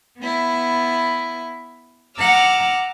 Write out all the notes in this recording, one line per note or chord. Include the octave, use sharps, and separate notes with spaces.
B3 E4
F#5 A#5 D6 E6 F6